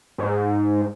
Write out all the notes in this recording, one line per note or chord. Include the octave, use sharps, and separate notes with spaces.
G#2